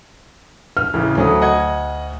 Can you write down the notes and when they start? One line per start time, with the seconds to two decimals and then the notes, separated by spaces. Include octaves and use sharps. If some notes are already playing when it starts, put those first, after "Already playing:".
0.77 F6
0.94 A1 C#3 E3
1.18 D2 F#3 A3 D#6
1.42 D#5 F#5 G#6